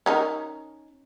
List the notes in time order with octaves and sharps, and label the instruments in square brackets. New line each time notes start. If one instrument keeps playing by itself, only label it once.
[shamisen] C#4 D#4 A#4